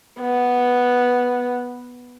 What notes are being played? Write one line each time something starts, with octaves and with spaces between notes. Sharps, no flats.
B3